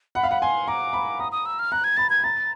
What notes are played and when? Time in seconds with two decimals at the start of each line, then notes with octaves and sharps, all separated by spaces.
0.15 F#5 B5
0.23 F5
0.31 F#5 B5
0.41 G#5 C6
0.68 A#5 D6
0.93 B5
1.20 A#5 D#6
1.32 D#6
1.46 E6
1.59 F6
1.72 A#5 F#6
1.84 G#6
1.97 B5 A6
2.10 G#6
2.24 A#5 A6